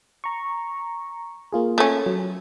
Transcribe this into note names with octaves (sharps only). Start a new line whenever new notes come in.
A#5 C#6
A#3 F4 G#4
A3 C#4
F#3